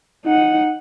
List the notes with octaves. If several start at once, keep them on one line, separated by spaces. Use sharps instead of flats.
D#4 F#5